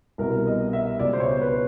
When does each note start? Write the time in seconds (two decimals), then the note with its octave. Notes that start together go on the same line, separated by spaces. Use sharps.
0.18 C2 B2 A#4
0.46 D#5
0.73 E5
0.99 C#2 B2 D5
1.13 C5
1.20 C#5
1.41 B4